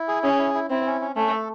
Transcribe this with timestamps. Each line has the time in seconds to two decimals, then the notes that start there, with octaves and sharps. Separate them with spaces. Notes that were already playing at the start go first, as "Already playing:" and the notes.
Already playing: E4
0.08 G#4
0.23 C#4 G#4
0.39 E4
0.54 E4
0.70 C4 E4
0.86 C#4
1.01 C#4
1.16 A3 C#4
1.31 A4